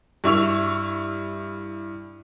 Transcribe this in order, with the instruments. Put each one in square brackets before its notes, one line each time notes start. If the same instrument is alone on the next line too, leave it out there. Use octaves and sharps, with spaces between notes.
[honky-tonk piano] G2 E4 C#6 E6 F7